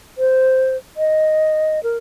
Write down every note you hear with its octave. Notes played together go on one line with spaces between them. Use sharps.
C5
D#5
A#4